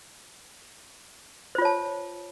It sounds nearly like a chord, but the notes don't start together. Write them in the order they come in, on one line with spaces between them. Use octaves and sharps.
C5 F4 C#5 A5